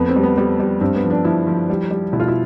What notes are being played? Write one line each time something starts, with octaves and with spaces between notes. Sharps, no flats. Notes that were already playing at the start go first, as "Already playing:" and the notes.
Already playing: F2 B3
C4
G3
B3
G3 B3
G3
G2 C4
B3
F3
D4
F3 E4
F3
G3
G3
B2 E4
F4
E4